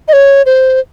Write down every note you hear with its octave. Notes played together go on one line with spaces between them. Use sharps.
D#5
C#5
C5